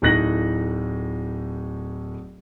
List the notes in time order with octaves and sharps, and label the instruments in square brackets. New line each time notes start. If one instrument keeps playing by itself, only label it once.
[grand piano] D1 A2 D#4 F#6 A#6 F#7